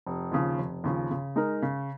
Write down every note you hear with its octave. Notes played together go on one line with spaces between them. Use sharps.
F1
D#2 C#3 F3
F1
D#2 C#3 F3
C#3
G#3 D#4 A#4
C#3